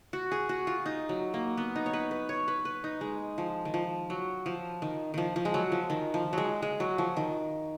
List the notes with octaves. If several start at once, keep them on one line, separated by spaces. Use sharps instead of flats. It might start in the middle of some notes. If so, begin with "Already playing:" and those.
F#4
G#4
F#4
F4
D#4
F#3
A#3
B3
D#4
C#5
B4
B4
C#5
B4
B4
D#4
G#3
F3
D#3
F3
F#3
F3
D#3
D#3 F3
F3
G#3
F#3
F3
D#3
F3
F#3 G#3
G#3
F#3
F3
D#3